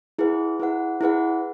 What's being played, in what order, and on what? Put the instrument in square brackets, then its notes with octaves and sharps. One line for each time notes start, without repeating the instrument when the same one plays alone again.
[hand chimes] E4 G#4 B4 F#5
E4 G#4 B4 F#5
E4 G#4 B4 F#5